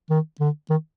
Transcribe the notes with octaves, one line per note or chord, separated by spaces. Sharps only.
D#3
D3
D#3